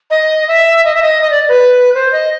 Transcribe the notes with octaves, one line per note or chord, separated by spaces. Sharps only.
D#5
E5
D#5
E5
D#5
D#5
D5
B4
C5
D#5